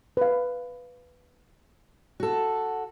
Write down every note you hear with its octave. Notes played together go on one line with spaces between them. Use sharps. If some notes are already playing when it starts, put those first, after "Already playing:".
B4 F5
F#4 A4